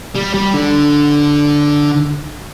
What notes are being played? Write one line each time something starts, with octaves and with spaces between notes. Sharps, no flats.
G3
G3
D3